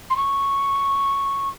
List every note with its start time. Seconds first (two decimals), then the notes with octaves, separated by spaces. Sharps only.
0.10 C6
0.17 C#6